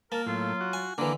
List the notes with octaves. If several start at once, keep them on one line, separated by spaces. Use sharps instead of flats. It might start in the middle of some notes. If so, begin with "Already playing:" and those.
A#3 A#4 A5
A2 F#3 F4
F#4
G#5
D3 E3 A#3 D4